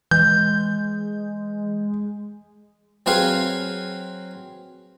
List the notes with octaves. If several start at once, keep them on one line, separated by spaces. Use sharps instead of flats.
E3 G#3 G6
F#3 C4 G#4 B4 F5